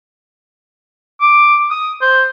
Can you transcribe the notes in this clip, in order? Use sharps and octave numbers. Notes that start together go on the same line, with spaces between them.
D6
D#6
C5